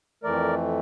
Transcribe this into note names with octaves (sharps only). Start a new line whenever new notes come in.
F2 E3 A3 A#4 D5